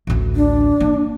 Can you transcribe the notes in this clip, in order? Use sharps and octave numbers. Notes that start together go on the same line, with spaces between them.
A1 D2
D4
A#3